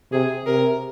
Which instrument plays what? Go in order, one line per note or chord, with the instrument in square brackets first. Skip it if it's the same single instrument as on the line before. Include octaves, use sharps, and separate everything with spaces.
[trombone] C3 [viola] G#4
[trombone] C3 [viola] A#4